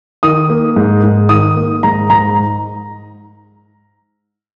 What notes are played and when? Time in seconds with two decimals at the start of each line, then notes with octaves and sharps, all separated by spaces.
0.23 D#3 D#6
0.50 A#3
0.76 G#2
1.03 G#2
1.29 D#3 D#6
1.57 A#3
1.83 G#2 A#5
2.10 G#2 A#5